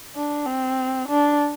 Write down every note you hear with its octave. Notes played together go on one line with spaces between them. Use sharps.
D4
C4
D4